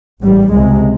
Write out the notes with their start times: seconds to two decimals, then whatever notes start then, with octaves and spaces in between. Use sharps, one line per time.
0.23 A1 G#2 G3
0.51 C#2 C3 G#3